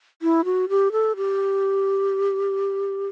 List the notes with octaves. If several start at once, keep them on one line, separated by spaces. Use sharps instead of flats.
E4
F#4
G4
A4
G4